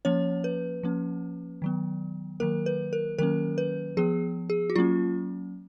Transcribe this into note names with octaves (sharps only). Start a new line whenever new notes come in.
F3 A#3 C#4 C#5
B4
F3 A#3 C#4
D#3 F#3 B3
D#3 F#3 A#3 A#4
B4
A#4
D#3 F#3 A#3 C#4 A#4
B4
F3 B3 G#4
G#4
F#4
F#3 A#3 C#4 F4